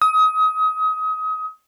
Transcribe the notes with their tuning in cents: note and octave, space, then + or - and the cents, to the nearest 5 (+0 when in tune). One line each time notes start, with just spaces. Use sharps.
D#6 +30